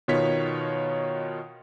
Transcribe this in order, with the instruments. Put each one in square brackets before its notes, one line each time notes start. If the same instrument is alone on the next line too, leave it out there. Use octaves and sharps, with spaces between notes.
[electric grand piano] B2 D#3 B3 F4 C#5 B6